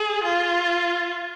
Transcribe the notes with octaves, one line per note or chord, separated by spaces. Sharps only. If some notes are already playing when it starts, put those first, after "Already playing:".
Already playing: G#4
F4